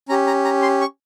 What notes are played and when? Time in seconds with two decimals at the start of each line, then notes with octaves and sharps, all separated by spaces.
0.09 C#4 G4 A#5
0.27 A#5
0.45 A#5
0.62 C6
0.81 C#6